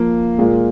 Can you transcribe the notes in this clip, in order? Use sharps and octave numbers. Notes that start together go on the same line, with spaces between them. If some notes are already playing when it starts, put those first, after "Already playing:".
Already playing: F3 A#3 F4
A#2 G#3 F4 A#4